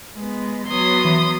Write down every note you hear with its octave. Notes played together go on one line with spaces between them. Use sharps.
G#3 B3
F#3 B3 C6 D#6
E3